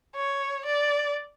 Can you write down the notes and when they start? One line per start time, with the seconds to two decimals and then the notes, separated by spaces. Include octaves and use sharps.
0.16 C#5
0.65 D5